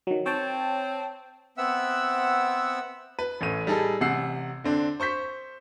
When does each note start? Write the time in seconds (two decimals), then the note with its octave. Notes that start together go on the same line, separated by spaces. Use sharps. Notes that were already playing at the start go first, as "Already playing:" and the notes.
0.07 D#3 F#3
0.26 C4 C#5 G5 A5
1.58 B3 C4 E5 F#5 E6
3.19 B4
3.41 A1 A2 D#7
3.67 G3 D#4 G#4 A4
4.01 A1 C3 F#5 E6 C7
4.64 D3 C4 D4
5.00 C5 C#6 G6 B6